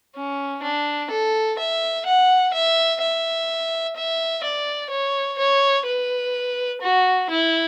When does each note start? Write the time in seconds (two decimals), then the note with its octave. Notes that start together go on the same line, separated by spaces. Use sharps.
0.15 C#4
0.63 D4
1.10 A4
1.59 E5
2.05 F#5
2.54 E5
3.01 E5
3.96 E5
4.43 D5
4.91 C#5
5.38 C#5
5.86 B4
6.81 F#4
7.30 E4